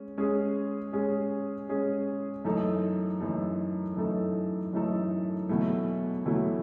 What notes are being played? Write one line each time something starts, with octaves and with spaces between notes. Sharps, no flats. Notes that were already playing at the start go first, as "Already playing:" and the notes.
Already playing: G#3 C#4
G#3 C#4 G#4
G#3 C#4 G#4
G#3 C#4 G#4
F#2 E3 A3 D#4 A4
F#2 E3 A3 D#4 A4
F#2 E3 A3 D#4 A4
F#2 E3 A3 D#4 A4
E2 B2 F#3 A3 E4
E2 B2 F#3 A3 E4